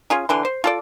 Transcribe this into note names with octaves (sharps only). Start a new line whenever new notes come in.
C#4 F4 G#4
D3 E3 C6
C5
F4 A4 D5